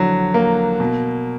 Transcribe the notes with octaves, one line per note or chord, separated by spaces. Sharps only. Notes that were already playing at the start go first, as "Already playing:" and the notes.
Already playing: F2 D3 F#3
A#3
B2